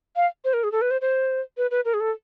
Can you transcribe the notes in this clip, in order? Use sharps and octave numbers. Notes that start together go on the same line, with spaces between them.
F5
C5
A#4
G#4
A4
B4
C5
C5
B4
B4
A#4
G#4
A4